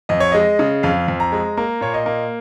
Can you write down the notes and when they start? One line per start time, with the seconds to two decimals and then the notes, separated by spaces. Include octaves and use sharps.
0.09 F2 D#5
0.20 C#5
0.32 G#3 D#5
0.59 C#3
0.83 F2 F5
1.08 F2
1.20 A#5
1.32 G#3
1.57 A#3 A#5
1.81 A#2 C#5
1.94 D#5
2.06 A#3